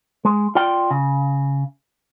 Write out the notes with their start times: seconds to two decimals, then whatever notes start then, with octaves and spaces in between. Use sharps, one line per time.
0.25 G#3
0.55 F4 D5 G5
0.91 C#3